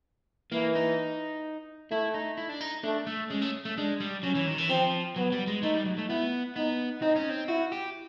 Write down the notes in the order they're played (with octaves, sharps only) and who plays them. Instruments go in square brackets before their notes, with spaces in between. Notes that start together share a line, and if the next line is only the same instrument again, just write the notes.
[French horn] E3 [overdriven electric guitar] A#3
[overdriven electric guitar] D#4
[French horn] A3 [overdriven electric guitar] E4
[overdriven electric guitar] D#4
E4
D4
D#4
[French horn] A3 [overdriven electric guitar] D4
[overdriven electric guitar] A3
[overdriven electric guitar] G#3 [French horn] C#4
[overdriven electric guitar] A3
A3
[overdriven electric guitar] G#3 [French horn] D4
[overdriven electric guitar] G3
[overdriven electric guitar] F#3 [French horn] C#4
[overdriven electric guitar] E3
D#3
E3
[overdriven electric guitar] F3 [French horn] C4
[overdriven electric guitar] F#3 [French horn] B3
[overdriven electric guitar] G3
G#3
[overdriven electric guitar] A3 [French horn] D#4
[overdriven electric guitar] G3
F#3
A3
[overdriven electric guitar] B3 [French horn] E4
[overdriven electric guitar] B3 [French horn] D#4
[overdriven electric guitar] C4 [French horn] D#4
[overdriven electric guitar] C#4
C4
[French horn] E4 [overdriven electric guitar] F#4
[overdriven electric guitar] G4